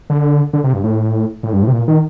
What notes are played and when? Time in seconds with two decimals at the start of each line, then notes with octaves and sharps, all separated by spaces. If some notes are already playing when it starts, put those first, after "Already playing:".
0.10 D3
0.53 D3
0.64 C3
0.73 G2
0.84 A2
1.43 A2
1.53 G2
1.63 A2
1.68 C3
1.73 A#2
1.88 D#3